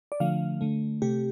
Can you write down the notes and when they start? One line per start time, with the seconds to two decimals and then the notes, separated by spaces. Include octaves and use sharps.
0.12 D5
0.20 D3 F3 A3 F5
0.61 D3 A3
1.02 C3 A3 G4